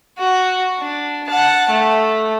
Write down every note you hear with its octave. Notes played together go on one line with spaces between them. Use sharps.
F#4
D4
F#5 A5
A3